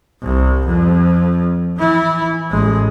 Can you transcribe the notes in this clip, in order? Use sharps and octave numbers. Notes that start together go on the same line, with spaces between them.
C2
F2
E3 E4
A1 G#3